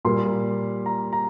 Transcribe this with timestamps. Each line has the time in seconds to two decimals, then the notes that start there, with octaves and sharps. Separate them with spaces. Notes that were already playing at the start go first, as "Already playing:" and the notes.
0.05 A#2 G3 A#3 C6
0.86 A#5
1.13 A#5